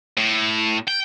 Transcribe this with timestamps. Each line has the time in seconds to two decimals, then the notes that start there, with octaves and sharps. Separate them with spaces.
0.18 A2
0.88 G5